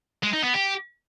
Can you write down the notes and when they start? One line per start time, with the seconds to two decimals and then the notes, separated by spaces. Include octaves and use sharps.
0.23 G#3
0.33 D#4
0.43 B3
0.54 G4